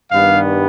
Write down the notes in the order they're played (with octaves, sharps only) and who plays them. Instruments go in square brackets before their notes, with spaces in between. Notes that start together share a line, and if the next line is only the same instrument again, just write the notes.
[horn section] G2 D#3 G3 B3 F5